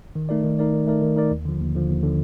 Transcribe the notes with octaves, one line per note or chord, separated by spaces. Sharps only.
D#3
A3 D#4 A#4 D5
D#3
A3 D#4 A#4 D5
D#3
A3 D#4 A#4 D5
D#3
A3 D#4 A#4 D5
D#2
D3 F3
D#2
D3 F3
D#2
D3 F3